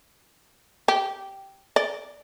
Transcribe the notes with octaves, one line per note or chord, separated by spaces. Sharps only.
G4
D5